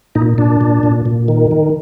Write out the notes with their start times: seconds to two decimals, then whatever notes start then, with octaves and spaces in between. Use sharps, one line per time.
0.15 A#2 D#4
0.38 A#2 D4
0.61 A#2
0.83 A#2
1.06 A#2
1.28 D#3
1.51 D#3